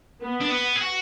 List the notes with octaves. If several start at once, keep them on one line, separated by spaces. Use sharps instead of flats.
B3
D4
B3
G#4
F#4